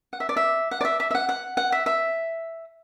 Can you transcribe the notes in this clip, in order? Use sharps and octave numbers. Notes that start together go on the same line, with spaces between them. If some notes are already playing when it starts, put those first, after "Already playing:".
F#5
E5
D5
E5
F#5
D5
E5
E5
E5
F#5
F#5
F#5
E5
E5